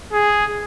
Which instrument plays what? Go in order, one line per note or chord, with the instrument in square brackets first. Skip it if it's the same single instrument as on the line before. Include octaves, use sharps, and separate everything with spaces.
[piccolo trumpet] G#4